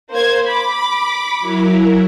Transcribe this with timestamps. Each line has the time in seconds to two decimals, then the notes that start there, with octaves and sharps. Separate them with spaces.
0.11 A#3 C5 G#6
0.46 B5 D6
1.40 F#3 E4 A#4